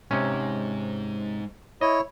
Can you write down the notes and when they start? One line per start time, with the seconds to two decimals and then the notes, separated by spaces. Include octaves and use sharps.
0.11 G#2 C3 C#4
1.81 E4 C#5 D#5